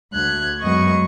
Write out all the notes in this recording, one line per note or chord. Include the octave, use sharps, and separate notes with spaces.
D2 F#6 G#6
F#2 G#3 B3 D#5 C#6